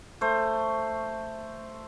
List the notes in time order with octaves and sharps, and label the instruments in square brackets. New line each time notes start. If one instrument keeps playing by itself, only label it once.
[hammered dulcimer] A3 C5